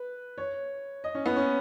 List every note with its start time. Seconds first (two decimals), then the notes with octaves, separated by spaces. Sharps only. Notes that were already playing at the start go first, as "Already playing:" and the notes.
Already playing: B4
0.38 C#5
1.04 D#5
1.15 C#4
1.26 B3
1.36 C#4